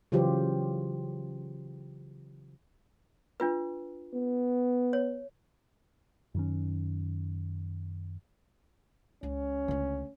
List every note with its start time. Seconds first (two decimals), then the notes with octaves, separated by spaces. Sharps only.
0.12 C#3 E3 F#3 F4 G4 C5
3.40 D4 F4 B4
4.14 B3
4.93 C#5
6.34 F#2 D#3 C#4
9.23 C#2 C#4
9.68 C#2 D3 A3